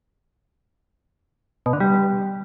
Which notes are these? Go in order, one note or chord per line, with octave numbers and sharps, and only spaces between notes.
B2
D3
G3